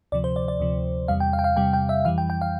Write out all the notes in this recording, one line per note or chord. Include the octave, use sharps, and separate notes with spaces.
D2 C3 F3 D5
C5
D5
D5
D2 C3 F3
E2 C3 G3 F5
G5
F5
G5
F5
E2 C3 G3 G5
G5
E5
F2 E3 G3 F5
G5
G5
F5